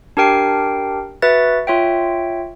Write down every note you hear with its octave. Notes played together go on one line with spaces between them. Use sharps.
D4 G4 A#4 G5 C7
F#4 B4 E5 A6
F4 C#5 E5 G5